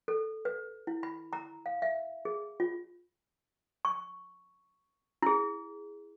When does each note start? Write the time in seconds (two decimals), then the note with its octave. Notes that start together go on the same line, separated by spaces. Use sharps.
0.08 A4
0.45 B4
0.87 E4
1.03 B5
1.33 A#5
1.66 F5
1.82 E5
2.25 G#4
2.60 F4
3.85 C#6
5.23 E4 G#4